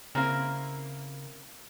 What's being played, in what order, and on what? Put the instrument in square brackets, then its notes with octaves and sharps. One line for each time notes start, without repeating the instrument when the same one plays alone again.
[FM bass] C#3 [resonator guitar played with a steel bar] A#3 C4 E4 [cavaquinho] A#4 F5